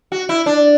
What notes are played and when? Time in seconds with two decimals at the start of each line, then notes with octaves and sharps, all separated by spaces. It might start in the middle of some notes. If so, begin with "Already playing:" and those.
0.12 F#4
0.29 E4
0.46 D4